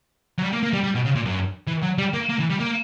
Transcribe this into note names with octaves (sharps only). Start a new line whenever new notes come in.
F#3
G3
A#3
A#3
G3
G3
B2
C#3
A#2
F#2
E3
F#3
G3
A#3
A#3
E3
G3
A#3